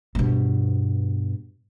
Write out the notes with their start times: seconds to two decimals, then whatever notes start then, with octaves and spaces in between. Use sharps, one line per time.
0.15 G2 B2